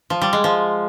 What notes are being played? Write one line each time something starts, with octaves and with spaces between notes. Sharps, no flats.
F3
G3
G#3
F3